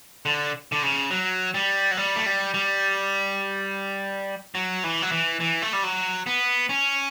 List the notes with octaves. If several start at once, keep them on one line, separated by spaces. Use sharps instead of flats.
D3
D3
C#3
F#3
G3
F#3
G3
A3
G3
G3
F#3
E3
F#3
E3
E3
A3
G3
F#3
B3
C#4